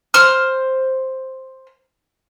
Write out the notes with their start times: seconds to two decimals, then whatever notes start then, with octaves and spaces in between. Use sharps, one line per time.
0.14 C5 F6